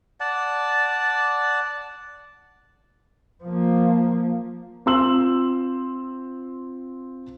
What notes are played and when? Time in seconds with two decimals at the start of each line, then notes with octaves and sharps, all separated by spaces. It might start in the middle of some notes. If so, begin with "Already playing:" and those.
0.20 D5 F#5 A5
3.44 F3 A#3
4.86 C4 F4 C6 E6 F#7